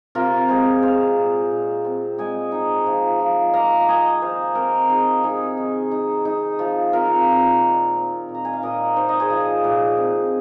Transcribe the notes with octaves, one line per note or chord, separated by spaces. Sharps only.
C3 F4 A#4
G#3 G#4 C5
C4 C5 F5
A#2
A#2
C4
G#3 D#5 G#5
D#4
F3
F3
A#3 F5 A#5
A#5
A#3 D#5 G#5
D#3 C5 F5
C4 A#4 D#5
F3 D#4 G#4
C3 D#4 G#4
D#3
D#4
D#4
F3
C4 F4 A#4
A#2
D#3
C4
A#2
A#5
G#5
F5
A#2 A#4 D#5
D#4 C5
D#5
G#4 C5
F3
A#2
C4